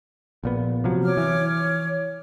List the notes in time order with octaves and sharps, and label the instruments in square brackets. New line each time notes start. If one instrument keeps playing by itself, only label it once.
[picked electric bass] A#1 A#2 B3
C3 F3 F#3
[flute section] C#5 D6 F6
[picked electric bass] E3